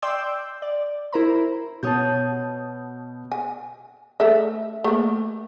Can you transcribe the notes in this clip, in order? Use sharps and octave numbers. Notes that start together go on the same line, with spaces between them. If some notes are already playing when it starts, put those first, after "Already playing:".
D5 G5 C6 D6 E6 G6
D5
E4 A#4 C5 A#5 B5
B2 F#4 C#5 A5 D#6 G6
G#5
A3 A4 E5
A3 A#3